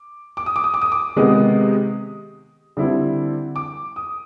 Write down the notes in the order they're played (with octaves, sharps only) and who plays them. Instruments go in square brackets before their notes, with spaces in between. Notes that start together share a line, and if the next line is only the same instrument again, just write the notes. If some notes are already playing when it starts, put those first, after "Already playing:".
Already playing: [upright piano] D6
D6
D#6
D6
D#6
D6
D#6
D6
C3 D#3 G#3 B3 D#4 D#6
D3 G3 C4 E4
D6
D#6